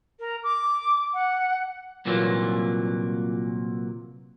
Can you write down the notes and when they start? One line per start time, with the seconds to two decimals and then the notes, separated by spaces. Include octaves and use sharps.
0.20 A#4
0.44 D6
1.14 F#5
2.05 C2 A#2 E3 F#3 A#3